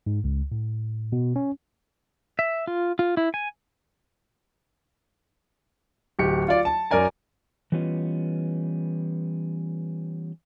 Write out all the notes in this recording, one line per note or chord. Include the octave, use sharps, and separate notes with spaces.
G#2
C#2
A2
B2
C#4
E5
F4
F4
E4
G#5
D1 G4 C#7
F4 D5
A5
F#2 A#4 D5 G#5 A#5
E3 G3 B3 C#4 F4 D#5